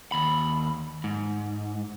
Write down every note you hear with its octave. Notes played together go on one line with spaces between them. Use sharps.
D#2 B5
G#2